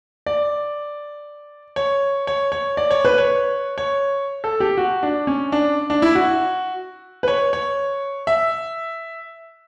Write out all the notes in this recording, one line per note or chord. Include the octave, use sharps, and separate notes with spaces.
D5
C#5
C#5
C#5
D5
C#5
B4
C#5
C#5
A4
G4
F#4
D4
C#4
D4
D4
E4
F#4
B4
C#5
C#5
E5